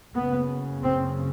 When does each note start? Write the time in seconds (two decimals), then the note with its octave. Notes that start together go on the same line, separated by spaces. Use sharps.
0.15 F#1 F#2 C#3 B3
0.82 C4